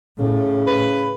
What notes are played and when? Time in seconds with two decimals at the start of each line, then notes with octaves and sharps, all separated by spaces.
0.19 A2 C#3
0.67 B4